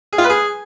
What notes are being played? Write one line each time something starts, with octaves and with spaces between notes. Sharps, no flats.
G#4
F4
B4
G#4